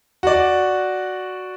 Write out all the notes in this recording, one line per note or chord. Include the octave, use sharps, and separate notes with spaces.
F#4 D5